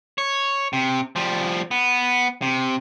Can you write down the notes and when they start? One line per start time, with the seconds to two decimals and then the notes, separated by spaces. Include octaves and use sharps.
0.18 C#5
0.73 C3
1.16 F3 G3
1.71 B3
2.42 C3